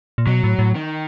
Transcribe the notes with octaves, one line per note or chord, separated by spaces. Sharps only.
A#2
B2 F#3
A2
A2
D#3